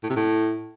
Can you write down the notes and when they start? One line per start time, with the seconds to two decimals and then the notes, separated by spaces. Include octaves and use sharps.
0.03 A2
0.10 C3
0.16 A2